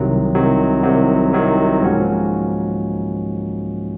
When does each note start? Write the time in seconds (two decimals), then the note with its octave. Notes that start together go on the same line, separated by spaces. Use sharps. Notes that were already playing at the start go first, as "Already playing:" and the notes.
Already playing: C2 C3 D#3 F#3
0.34 C2 C3 D#3 F#3
0.83 C2 C3 D#3 F#3
1.33 C2 C3 D#3 F#3
1.82 G#2 F3 A#3 C#4 F#4